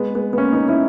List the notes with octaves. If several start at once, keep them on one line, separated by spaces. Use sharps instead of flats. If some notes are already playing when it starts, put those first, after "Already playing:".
Already playing: G#3 B3
G#3 B3
B3
A#3 C#4
B3 D#4
C#4 E4